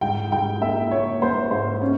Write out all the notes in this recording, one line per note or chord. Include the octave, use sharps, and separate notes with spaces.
G#2 G5
G#2 G5
A#3 E5
A#3 C#5
A#3 C5
G#2 C5
A#3 C#4